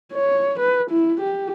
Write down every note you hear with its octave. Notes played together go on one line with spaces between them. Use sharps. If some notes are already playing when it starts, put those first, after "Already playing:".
C#5
B4
E4
G4